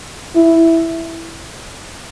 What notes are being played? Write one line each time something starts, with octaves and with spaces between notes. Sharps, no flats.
E4